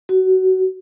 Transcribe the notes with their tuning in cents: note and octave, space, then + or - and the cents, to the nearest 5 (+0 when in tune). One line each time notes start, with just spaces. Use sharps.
F#4 +20